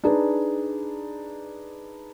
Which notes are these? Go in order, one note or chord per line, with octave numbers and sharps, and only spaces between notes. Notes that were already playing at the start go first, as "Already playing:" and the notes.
D4 D#4 G#4 B4